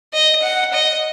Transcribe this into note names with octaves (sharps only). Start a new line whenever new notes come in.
D#5
F#5
D#5